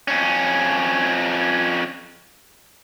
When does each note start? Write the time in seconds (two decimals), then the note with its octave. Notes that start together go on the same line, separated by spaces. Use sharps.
0.08 F2 C#4